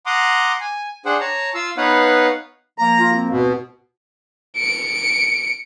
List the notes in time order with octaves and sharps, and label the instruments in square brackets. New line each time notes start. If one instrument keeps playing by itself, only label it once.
[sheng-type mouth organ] F#5 A#5 C6 D6 D#6
G#5
D4 G#4 C5 F#5 G5
C#5 A5 A#5
F4 F5 E6
B3 D#4 B4 C#5 F5 F#5
[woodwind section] F3 A#3 [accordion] A#5
[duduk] F4
C4
[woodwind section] D2 G#2 [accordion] B2
[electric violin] C#7 D7